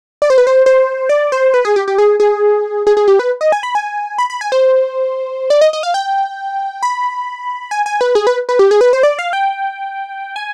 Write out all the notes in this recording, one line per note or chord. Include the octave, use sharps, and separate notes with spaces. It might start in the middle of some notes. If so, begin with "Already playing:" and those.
D5
C5
B4
C5
C5
D5
C5
B4
G#4
G4
G4
G#4
G#4
G#4
G#4
G4
B4
D#5
G#5
B5
G#5
B5
B5
G#5
C5
D5
D#5
D#5
F5
G5
B5
G#5
G#5
B4
G#4
B4
B4
G4
G#4
B4
C5
D5
F5
G5
G#5